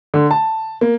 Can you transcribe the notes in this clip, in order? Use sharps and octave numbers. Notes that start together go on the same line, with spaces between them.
D3
A5
A#3